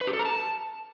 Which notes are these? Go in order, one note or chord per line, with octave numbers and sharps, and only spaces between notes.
B4
G4
A4
A#5
A5